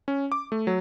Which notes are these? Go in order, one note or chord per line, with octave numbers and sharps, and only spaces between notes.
C#4
D6
A3
F#3